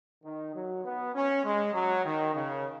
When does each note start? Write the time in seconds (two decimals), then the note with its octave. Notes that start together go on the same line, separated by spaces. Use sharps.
0.24 D#3
0.54 F#3
0.84 B3
1.14 C#4
1.44 G#3
1.73 F#3
2.04 D#3
2.34 C#3